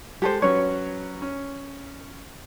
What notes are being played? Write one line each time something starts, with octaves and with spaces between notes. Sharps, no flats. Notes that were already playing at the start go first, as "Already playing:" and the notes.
G#3 G4 A4 C5
F#3 C#4 B4 C#5
C#4